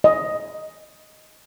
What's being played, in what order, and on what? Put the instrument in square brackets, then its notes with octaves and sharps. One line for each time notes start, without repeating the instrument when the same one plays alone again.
[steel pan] D#5